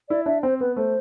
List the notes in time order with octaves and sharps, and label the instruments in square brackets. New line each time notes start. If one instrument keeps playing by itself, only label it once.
[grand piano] E4 [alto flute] D5
[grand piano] D4 [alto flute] E5
[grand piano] C4 [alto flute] C5
[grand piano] B3 [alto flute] B4
[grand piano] A3 [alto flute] C5